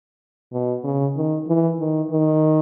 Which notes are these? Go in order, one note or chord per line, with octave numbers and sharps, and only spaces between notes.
B2
C#3
D#3
E3
D#3
D#3